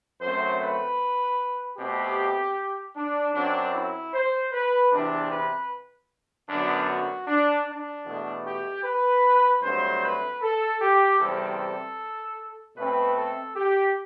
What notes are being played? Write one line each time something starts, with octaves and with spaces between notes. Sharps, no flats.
F#2 F#3 A3 C4 C5
B4
B2 A3 C4 G4
D4
F#2 F#3 C4 D4
E4
C5
B4
E2 C3 E3 D4
B4
F#2 D3 F#3 B3 D4
F#4
D4
D4
E2 B2 A3
G4
B4
G2 F#3 A3 C4 C5
B4
A4
G4
E2 C3 G3 C4 A4
B2 A3 C4 B4
A4
G4